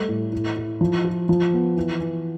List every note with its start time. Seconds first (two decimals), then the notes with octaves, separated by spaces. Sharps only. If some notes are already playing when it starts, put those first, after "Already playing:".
Already playing: G3 A3
0.09 A2
0.33 E4
0.57 E4
0.81 F3
1.04 F4
1.29 F3
1.53 B3
1.77 E3
2.00 E3